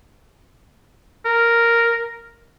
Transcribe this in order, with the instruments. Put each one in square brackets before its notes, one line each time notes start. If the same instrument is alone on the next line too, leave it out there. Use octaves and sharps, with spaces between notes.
[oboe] A#4